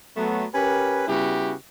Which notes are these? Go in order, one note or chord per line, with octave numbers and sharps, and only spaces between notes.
F#3 A3 B3
C#4 G4 A#4 B4
C#3 G3 B3 E4 F#4 G4